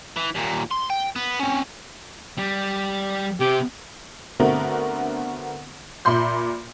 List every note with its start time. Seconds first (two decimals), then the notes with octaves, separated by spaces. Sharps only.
0.17 E3
0.35 D#2 A#2
0.71 C6
0.90 G5
1.16 B3
1.40 C4 C#4
2.38 G3
3.40 C3 G4
4.40 D3 A3 B3 C4 F#4 A#4
6.05 A#2 E5 B5 C6 G6